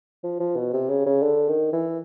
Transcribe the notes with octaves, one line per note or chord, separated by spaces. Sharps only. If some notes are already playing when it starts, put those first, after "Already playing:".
F3
F3
B2
C3
C#3
C#3
D3
D#3
E3